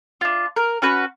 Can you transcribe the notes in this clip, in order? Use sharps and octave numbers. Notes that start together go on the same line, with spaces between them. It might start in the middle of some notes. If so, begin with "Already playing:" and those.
D4 F4
A#4
C#4 F#4 B4